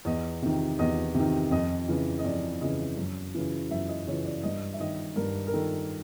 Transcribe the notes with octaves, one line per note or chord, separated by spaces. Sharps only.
E2 D#5
C3 D#3
E2 D#5
C3
D#3
F2 D#5
C#3 E3
D#5
F2 D5
C#3 E3 D#5
F#2
C#3 E3
F#2 E5
D#5
C#3 E3 C#5
D5
G2 D#5
E5
D#3 D#5
G2 A#4
A#4
D#3 A4